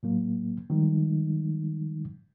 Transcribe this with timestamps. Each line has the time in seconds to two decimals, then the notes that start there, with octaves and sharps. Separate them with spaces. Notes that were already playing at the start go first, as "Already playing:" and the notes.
0.03 A2 F#3 A#3
0.70 D#3 F3 G3 G#3 D#4